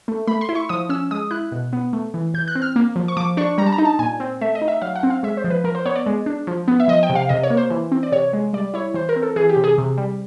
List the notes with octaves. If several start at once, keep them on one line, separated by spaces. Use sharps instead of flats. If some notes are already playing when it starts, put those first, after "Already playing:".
A3
A3 B5
C6
E4
C#6
F3 D#6
C#4 E6
G#3 D#6
E4 F#6
B2
B3
A3
E3
E3 G6
F#6
C4
F6
A#3
F3
C#6
F3 D6
D4 C#6
G3 A#5
A5
A#5
D#4
A5
A#2 G#5
C4
A3 E5
D#5
D#4
E5
F#3 F5
F#5
C4
F5
G#3 E5
C5
F3
B4
F3 A#4
C5
B3 C#5
D5
G#3
D4
F3
B3
E5
F3 D#5
G5
C3
F5
C3 D#5
C#5
A#3
C5
E3
C4
D5
C3 C#5
G#3
G3 D5
E4 C#5
E3 C5
A#4
C4
A4
E3 G#4
G4
C3
G#4
C3
G3